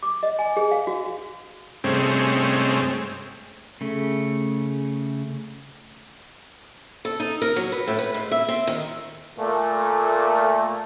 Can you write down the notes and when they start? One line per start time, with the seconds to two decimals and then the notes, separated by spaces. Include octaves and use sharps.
0.03 D6
0.23 D#5
0.39 G#5
0.57 G#4
0.72 F5
0.87 F#4
1.84 G2 C3 G#3 A3 C4 C#4
3.81 C#3 A3
7.05 A4
7.20 D#4
7.42 A#4
7.56 F#3
7.72 B4
7.87 A2
7.99 B4
8.14 G#2
8.31 E5
8.48 C4
8.67 D#3
9.38 A#2 A3